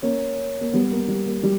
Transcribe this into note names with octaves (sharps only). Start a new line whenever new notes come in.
A#3 C#4
A#3
G3 B3
A#3
G3
A#3
G3